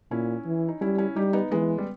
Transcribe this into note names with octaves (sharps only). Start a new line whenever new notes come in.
A#2 C#4 E4
E3
D#4
G3 C#4 E4
C#4 E4
G3 D#4 G4
B3 D#4
E3 G#3 B3
G3